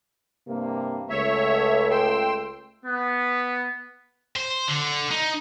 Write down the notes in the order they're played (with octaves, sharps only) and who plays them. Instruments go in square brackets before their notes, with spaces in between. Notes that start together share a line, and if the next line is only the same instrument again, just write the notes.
[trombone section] G2 C3 A#3
[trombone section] C#2 A3 [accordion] C#5 E5
[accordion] G5 C6 E6
[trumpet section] B3
[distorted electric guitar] C5
D3
D#4